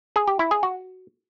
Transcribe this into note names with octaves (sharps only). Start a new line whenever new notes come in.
G#4
G4
E4
G#4
F#4